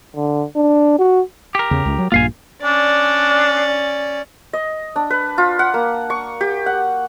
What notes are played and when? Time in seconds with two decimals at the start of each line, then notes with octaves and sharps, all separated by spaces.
0.16 D3
0.56 D4
0.99 F#4
1.55 G4 A#4
1.71 E2 C#3
1.85 C#2
1.98 F#3
2.12 A#1 G2 A#3 F4 F5 G#5
2.62 C#4 D4 D5
4.53 D#5
4.96 D4
5.10 B4
5.38 F4
5.59 F#5
5.74 A#3
6.10 C#6
6.41 G4
6.66 F#5